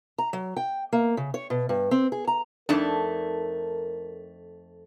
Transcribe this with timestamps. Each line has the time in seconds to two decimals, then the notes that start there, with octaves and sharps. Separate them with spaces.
0.18 A#5
0.33 F#3
0.57 G5
0.92 A#3
1.17 C#3
1.34 C#5
1.50 B2
1.69 G2
1.91 C4
2.12 G#4
2.27 A#5
2.69 F2 A3 D4 D#4 A#4 D5 A5